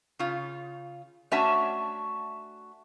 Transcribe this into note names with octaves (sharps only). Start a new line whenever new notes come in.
C#3 F4
A3 C#4 D4 F#4 E5 A5